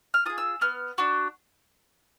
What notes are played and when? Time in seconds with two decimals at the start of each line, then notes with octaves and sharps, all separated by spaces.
0.14 F6
0.26 F4 G#4 D#6
0.38 E6
0.61 B3 F6
0.98 D4 F#4